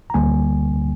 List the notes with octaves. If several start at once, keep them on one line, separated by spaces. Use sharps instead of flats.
A#5
D2 D3 G3 A#3 G#5